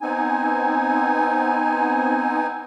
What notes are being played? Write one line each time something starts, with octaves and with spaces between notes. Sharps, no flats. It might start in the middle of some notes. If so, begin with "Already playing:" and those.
B3 C4 D#4 G#5